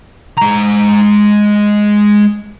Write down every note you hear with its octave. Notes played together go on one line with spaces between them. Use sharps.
G#3 A#5